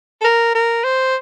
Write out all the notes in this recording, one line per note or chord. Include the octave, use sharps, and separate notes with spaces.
A4
A#4
A#4
C5